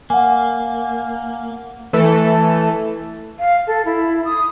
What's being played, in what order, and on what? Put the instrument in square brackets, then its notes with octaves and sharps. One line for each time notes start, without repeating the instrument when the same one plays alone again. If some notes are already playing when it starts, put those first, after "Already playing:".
[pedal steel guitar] A#3 [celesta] F#5 G#5
[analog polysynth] E3 A3 A4
[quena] F5
A4
E4
D#6